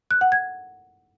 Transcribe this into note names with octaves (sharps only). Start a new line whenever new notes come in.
F#6
F#5
G#6